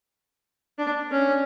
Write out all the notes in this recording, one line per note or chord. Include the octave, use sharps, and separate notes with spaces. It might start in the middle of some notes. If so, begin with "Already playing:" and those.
D4
C#4